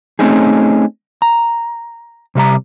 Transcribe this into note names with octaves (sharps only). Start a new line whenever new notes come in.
A3 C4 C#4 D#4 G#4
A#5
C3 G3 D#5 A#5